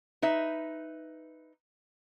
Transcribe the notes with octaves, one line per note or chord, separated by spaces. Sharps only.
D#4 B4 E5